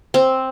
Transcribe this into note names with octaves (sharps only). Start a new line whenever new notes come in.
C4